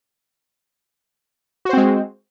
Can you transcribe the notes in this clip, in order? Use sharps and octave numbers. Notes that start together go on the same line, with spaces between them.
G#3 C4 F#4 C5